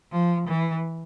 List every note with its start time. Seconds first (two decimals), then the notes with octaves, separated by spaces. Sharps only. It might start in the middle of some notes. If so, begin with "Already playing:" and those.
0.12 F3
0.48 E3